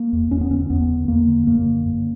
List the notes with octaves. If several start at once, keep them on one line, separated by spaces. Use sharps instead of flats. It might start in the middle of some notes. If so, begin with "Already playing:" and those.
Already playing: A#3
E2
E2 C#4
B3
D3 C#4
E2 B3
D3
E2 A#3
D3
F#2 A#3
D3
F#2